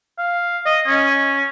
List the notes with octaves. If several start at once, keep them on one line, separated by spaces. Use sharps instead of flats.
F5
D#5
C#4